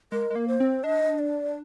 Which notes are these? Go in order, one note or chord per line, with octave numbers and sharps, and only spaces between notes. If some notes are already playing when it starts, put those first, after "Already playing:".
G#3 A#4
G#3
A#3
C5
C4
D4 D#5
D5